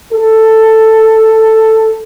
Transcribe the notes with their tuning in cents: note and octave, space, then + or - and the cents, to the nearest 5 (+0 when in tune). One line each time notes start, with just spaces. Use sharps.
A4 +5